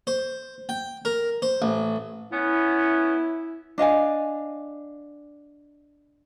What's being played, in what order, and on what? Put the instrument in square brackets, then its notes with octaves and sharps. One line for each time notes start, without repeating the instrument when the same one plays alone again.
[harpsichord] C5
G5
A#4
C5
A1
[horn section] B3 C#4 [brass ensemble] E4
[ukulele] D4 D#5 F5 G#5